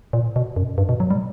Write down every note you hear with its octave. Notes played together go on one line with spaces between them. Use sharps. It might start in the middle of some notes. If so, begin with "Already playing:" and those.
A#2
B2
F#2
G2
B2
F#3
G3